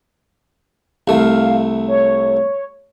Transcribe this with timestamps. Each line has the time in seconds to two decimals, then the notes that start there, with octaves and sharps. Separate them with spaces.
1.08 C2 A3 F5
1.88 C#5